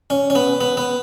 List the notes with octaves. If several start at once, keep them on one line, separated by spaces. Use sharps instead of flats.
C#4
C#4
B3
B3
B3